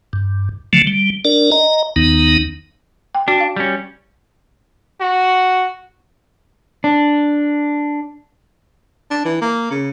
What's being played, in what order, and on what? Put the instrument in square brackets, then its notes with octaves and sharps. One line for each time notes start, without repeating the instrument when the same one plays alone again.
[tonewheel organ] G2
D3 F3 F#3 A3
G3
D4 A#4 D5
D#5 A#5
D#2 D#3 B3 D#4
[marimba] G5
[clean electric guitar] D4 [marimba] F#4
[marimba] F5
[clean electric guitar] G3 C#4
[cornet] F#4
[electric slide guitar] D4
[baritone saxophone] D4
E3
A#3
C#3